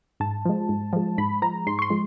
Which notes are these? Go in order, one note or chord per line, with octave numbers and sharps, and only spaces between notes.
G#2 A5
F3 G#3
G#2
F3 G#3
G#2 B5
F3 G#3 A#5
G#2 C6
C#6
C6
F3 G#3